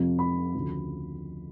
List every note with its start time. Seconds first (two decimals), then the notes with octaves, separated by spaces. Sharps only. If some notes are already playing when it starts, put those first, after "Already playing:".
Already playing: F2 C3 F3
0.19 B5
0.55 D2 C#3 F3